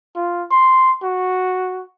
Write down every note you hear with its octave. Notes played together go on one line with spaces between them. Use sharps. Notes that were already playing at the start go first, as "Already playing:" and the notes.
F4
C6
F#4